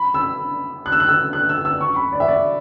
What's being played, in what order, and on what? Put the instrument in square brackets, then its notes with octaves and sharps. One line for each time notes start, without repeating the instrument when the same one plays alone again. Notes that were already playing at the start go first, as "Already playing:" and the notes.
Already playing: [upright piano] B5
E6
F#6
E6
F#6
E6
F#6
E6
E6
C#6
B5
D5
E5
D5